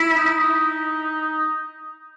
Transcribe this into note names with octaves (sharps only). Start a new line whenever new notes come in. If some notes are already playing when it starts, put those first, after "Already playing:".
Already playing: E4
D#4